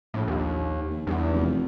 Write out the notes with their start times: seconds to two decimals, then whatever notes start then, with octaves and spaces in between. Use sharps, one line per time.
0.14 A#1 A2
0.28 D#2
0.90 D#2
1.07 E2 G2
1.34 F1